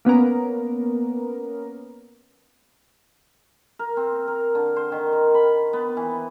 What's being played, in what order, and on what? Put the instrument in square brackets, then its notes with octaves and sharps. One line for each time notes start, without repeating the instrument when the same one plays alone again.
[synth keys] A#3 B3 C#4 A#4
[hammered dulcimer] A#4
C4
A#4
D3
C5
D#3
A#4
B5
B3
E3